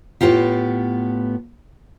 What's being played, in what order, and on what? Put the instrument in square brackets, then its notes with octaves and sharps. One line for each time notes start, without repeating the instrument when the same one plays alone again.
[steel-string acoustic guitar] A2 B3 D#4 F4 G4